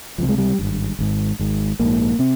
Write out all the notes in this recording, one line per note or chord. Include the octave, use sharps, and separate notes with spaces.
C#2 C3 F3
G#3
G3
G#1 G2
G#1 G#2
G#1 G#2
A#1 G#2 A#3
C3 C4